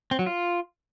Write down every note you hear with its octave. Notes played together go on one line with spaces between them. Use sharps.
C4
F#3
F4